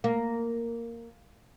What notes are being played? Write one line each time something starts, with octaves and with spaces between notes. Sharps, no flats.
A#3